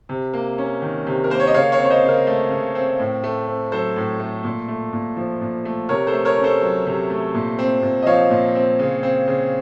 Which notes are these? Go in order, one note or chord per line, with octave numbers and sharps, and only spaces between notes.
C3
A#3
C#4
D#3
C3
A#4
A#3 C5
C#5
D#5
C#3 C#5 F5
C#5 F5
C4
C#5
C5 D#5
C#3
A#4
A3
C#3
C4
A2
A3
C4
F#3 A4 C5
A2
A3
A#2
A3
A#2
F3
A#2
A3
C3 A#4 C#5
A4 C5
A3
A#4 C#5
C#4
A4 C5
F#3
C3
A3
A#2
C4
A#2
D#5
F3 C#5 F5
A#2
C4
C#3
C4
C#3